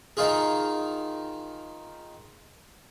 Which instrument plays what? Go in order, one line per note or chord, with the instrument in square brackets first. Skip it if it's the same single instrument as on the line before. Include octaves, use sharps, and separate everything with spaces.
[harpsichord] D#3 D#4 F4 G#4